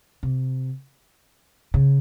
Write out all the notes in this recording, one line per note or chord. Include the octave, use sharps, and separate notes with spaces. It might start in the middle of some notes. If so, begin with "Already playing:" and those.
C3
C#3